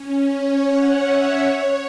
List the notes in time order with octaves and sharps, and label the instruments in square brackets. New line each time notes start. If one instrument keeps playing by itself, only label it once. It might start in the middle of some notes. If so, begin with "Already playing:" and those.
Already playing: [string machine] C#4
C#5
F#5
E5
C#5